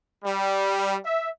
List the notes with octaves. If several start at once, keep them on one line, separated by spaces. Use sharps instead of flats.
G3
E5